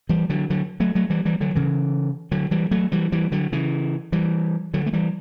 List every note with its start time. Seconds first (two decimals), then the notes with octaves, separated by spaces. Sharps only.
0.09 E3 G3
0.30 D3 F#3
0.50 D3 F#3
0.80 F#3 A3
0.95 F#3 A3
1.10 E3 G3
1.25 E3 G3
1.41 D3 F#3
1.55 C#3 E3
2.32 D3 F#3
2.51 E3 G3
2.71 F#3 A3
2.92 E3 G3
3.12 E3 G3
3.32 D3 F#3
3.52 C#3 E3
4.12 E3 G3
4.74 D3 F#3
4.86 A3
4.93 E3 G3